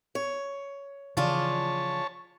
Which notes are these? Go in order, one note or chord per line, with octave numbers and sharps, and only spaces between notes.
C#5
C#3 E3 F3 D4 F4 G#4 C#5 A5